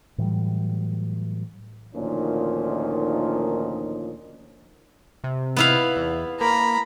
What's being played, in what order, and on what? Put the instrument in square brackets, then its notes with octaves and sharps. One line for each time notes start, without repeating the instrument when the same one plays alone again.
[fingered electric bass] A2 E3 F#3 G3
[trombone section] D2 A#2 D#3 F3 C#4 D#4
[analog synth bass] C3
[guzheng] B3 E4 F5
[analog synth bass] E2
[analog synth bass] A#3 [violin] A#5 B5